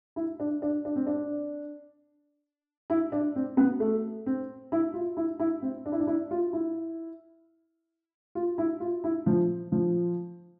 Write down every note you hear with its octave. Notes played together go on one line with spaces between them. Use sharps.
E4
D4
D4
D4
C4
D4
E4
D4
C4
B3
A3
C4
E4
F4
E4
E4
C4
D4
E4
D4
E4
F4
E4
F4
E4
F4
E4
F3
F3